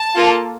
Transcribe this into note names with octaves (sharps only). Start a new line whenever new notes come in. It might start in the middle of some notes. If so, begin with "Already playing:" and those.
Already playing: A5
A#3 F4 A4